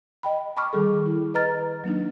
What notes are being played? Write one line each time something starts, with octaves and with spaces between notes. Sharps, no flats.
D#5 G5 B5
A5 B5 C#6 D6 F6
D#3 G3 G#4 A4
E4
B4 D#5 A#5 F6 A6
F#3 A#3 D4 D#4